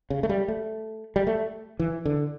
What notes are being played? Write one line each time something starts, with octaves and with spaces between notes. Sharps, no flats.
C#3
A3
G3
A3
G3
A3
E3
D3